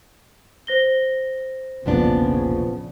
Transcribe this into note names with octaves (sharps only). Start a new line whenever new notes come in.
C5 A#6 G7
E1 A#1 A#2 C#3 F3 B3 D4